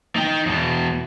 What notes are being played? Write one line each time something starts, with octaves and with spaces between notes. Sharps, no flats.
D#4 G5
E2 B2